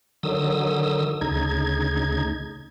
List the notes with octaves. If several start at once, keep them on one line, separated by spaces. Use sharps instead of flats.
D3 D#3 F#3 D#6 E6
D2 C#3 D#4 G#6